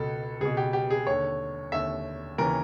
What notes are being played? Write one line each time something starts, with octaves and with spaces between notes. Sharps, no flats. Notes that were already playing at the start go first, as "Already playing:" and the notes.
Already playing: C#2 B2 A4
C#2 B2 G#4
G4
G4
G#4
D#2 D3 C#5
D#2 D3 E5
D#2 C#3 E3 A#4